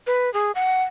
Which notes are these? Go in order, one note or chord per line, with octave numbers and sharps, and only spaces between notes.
B4
G#4
F#5